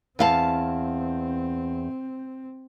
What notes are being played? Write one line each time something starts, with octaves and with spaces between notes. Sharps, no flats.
E2 C4 F5 A5